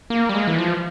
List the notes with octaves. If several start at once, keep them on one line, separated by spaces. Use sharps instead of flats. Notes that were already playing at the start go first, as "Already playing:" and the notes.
A#3
G3
G#3
E3
F3